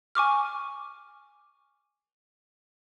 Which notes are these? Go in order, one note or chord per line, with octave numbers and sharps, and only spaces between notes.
G#5 C#6 D6 F6